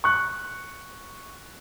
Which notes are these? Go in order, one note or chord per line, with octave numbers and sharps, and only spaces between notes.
C#6 F#6